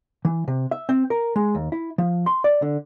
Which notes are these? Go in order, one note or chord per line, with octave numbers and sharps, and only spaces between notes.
E3
C3
E5
C4
A#4
G#3
D#2
E4
F3
C6
D5
D3